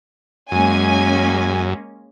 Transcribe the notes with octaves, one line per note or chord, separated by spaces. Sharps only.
F#2 G#3 A#3 C#4 G#5